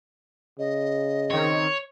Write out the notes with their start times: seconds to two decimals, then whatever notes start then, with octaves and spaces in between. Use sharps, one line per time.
0.59 C#3 D#5
1.30 D#3 C4 C#5